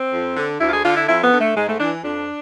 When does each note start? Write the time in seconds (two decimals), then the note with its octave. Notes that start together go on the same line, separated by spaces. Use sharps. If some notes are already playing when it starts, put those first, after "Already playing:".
Already playing: C4
0.13 F2
0.37 D3
0.61 D2 E4
0.69 F4
0.73 G#4
0.85 D3 F4
0.97 E4
1.08 F2 E4
1.24 B3
1.33 D3
1.41 A3
1.56 G#2 G#3
1.69 A3
1.80 E3 D4
2.04 F2 D4